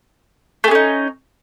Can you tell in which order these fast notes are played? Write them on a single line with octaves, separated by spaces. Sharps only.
A3 G#4 C#4 D#4